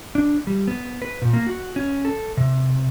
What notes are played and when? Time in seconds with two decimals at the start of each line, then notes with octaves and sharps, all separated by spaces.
0.15 D4
0.47 G3
0.68 B3
1.02 B4
1.22 A#2
1.33 A#3
1.46 F#4
1.76 C#4
2.05 A4
2.37 C3